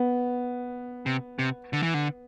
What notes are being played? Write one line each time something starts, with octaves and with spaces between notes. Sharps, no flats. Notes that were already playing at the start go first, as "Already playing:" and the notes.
Already playing: B3
C3
C3
D3
E3
D3